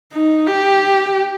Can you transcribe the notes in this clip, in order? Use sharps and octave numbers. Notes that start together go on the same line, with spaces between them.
D#4
G4